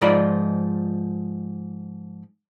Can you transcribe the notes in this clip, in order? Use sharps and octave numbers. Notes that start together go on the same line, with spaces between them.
G#2 F3 D#4 F4 D5 B5